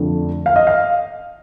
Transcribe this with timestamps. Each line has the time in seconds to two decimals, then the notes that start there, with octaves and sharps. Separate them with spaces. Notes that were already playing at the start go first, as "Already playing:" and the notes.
Already playing: F2 D3 A3
0.46 F5
0.56 D#5
0.67 F5